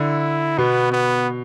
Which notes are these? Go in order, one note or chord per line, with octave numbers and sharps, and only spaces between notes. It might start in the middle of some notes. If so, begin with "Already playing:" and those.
Already playing: D3 E4
B2 B3
B3